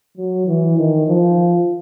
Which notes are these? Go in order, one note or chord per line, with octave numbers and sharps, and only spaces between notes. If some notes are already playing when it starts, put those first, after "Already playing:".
F#3
E3
D#3
F3